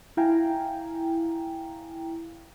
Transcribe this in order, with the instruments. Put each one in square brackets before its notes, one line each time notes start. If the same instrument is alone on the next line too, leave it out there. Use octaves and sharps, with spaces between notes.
[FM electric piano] E4 F5 G5 G#5 A#5